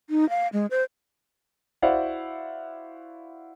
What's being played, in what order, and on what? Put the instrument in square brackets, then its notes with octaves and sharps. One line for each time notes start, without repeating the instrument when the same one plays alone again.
[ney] D#4
F5
G#3
C5
[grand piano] E4 F#4 C5 D5 F5 F#5